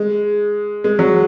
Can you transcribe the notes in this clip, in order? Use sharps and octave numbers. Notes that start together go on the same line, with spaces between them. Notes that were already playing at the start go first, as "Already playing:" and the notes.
Already playing: G#3
G#3
F#3